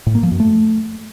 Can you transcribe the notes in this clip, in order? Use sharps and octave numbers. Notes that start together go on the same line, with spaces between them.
A2
A#3
F3
F#2
A3